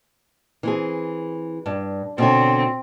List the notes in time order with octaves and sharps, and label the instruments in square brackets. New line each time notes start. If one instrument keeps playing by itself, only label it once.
[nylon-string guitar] E3 C4 G#4
G2
[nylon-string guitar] B2 D3 C#5 [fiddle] C4